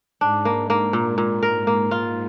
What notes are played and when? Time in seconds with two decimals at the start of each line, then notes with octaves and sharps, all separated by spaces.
0.21 G#2 D4
0.45 A#3
0.70 A#3
0.93 A#2
1.18 A#2
1.43 A#4
1.67 A#3
1.91 F4